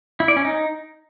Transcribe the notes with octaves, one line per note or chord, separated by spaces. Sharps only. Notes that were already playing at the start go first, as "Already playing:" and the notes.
E4
D5
C#4
D#4